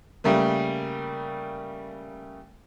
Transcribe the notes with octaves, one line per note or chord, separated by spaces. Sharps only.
C#3 G3 A3 A#3